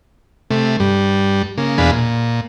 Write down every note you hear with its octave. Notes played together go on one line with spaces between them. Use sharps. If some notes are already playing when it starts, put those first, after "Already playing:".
C3 A3
G2 G3
C#3 A#3
E2 B2 D4 G#4 F5 B5
A#2